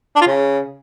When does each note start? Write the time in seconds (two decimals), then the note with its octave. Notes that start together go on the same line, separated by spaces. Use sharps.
0.16 D4
0.21 F4
0.27 C#3